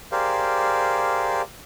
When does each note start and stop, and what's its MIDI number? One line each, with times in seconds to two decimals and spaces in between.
0.12 1.42 67
0.12 1.42 68
0.12 1.42 70
0.12 1.42 72
0.12 1.42 74
0.12 1.42 77